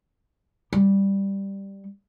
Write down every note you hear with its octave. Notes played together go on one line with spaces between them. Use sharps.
G3